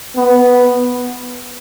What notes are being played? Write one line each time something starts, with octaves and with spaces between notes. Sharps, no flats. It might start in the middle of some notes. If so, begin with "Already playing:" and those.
B3